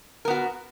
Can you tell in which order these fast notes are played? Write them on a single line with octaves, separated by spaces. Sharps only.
A#4 B3 F#4